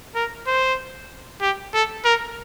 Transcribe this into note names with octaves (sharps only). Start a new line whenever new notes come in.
A#4
C5
G4
A4
A#4